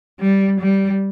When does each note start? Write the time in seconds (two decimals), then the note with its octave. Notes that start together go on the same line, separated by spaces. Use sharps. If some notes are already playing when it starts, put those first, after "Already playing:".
0.20 G3
0.60 G3